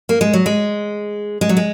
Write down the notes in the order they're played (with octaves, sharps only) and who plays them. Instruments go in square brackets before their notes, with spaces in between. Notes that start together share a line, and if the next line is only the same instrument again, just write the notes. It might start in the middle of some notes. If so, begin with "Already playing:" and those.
[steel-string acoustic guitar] A#3
G#3
F#3
G#3
G#3
F#3
G#3